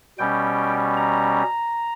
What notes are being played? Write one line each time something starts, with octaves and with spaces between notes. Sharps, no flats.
B2 G3 C#4 G5
A#5